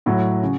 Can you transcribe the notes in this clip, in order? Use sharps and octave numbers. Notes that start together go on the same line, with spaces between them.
A2 F#3 A3 F#4
C#3